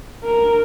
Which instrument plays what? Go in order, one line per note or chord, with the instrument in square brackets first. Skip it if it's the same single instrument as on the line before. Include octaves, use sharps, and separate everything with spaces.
[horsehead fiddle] A#4